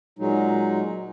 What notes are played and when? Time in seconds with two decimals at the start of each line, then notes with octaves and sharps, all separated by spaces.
0.19 A#2 F#3 G#3 D#4